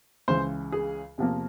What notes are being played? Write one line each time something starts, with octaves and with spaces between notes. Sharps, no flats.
C#2 C#3 E3 C5
G#4
E2 C3 F3 A#3